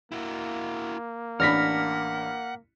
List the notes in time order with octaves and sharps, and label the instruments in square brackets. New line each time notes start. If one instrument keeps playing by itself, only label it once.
[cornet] A#3 [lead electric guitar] E4 F#4
[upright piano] A1 D4 B5 [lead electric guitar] F#5 [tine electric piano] F6 A#6 B6